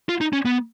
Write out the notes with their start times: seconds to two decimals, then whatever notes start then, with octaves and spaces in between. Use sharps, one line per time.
0.09 F4
0.21 D#4
0.33 C#4
0.45 B3